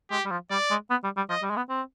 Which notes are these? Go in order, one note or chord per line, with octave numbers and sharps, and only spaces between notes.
G#3 G4
G3
F3
G3 D5
G#3
B3
G3
G3
F3 D#5
G3
G#3
B3
C4